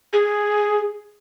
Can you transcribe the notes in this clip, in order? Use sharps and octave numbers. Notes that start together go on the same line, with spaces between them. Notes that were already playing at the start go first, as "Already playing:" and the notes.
G#4